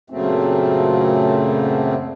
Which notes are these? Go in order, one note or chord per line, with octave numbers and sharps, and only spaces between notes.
F#2 A#2 C#3 F#3 A3 C4